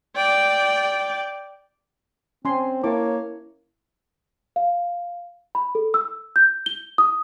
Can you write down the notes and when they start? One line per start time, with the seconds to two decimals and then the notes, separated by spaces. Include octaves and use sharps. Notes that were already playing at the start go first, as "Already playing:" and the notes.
0.16 D5 G5
2.45 C4 C#4 G#5 C6
2.84 A#3 E4 C#5 A5 D6
4.56 F5
5.55 B5
5.75 A4
5.94 E6
6.36 G6
6.66 G7
6.98 D#6